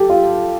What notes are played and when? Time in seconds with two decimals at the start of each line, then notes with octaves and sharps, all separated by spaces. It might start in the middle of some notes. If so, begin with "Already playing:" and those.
Already playing: G4 A4
0.09 F4